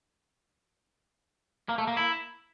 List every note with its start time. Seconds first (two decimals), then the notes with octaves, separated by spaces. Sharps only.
1.69 A#3
1.78 A3
1.87 A#3
1.97 E4